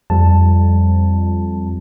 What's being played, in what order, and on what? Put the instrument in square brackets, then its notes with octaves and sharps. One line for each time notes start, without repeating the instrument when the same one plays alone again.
[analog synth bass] F2 [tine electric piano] G3 A5